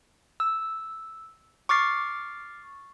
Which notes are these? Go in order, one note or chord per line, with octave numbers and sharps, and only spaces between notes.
E6
C#6 D6 F6 A6 C7